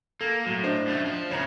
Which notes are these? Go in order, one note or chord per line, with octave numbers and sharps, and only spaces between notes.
A#3 A4
A2 F#3
D4 C5 D#5
F#2 A3
F3
E2 C#3 C#5 A#5